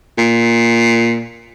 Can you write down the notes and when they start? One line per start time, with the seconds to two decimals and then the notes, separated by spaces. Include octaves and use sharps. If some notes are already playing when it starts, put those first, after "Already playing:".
0.18 A#2